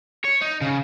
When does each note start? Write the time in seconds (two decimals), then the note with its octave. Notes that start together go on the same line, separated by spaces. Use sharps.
0.24 C#5
0.41 D#4
0.61 C#3